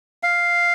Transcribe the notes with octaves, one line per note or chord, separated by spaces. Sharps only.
F5